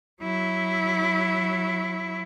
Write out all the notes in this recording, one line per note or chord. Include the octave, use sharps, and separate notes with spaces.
F#3 E4